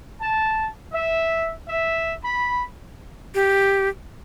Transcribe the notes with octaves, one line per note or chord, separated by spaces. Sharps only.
A5
E5
E5
B5
G4